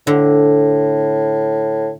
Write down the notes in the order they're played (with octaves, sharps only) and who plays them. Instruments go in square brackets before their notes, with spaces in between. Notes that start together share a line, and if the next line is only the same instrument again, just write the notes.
[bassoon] A2 [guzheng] D3